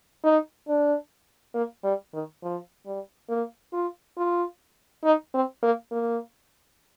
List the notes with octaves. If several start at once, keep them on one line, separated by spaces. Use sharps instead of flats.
D#4
D4
A#3
G3
D#3
F3
G3
A#3
F4
F4
D#4
C4
A#3
A#3